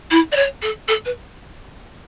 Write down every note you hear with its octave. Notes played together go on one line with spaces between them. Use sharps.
E4
D5
C#5
A4
A4
B4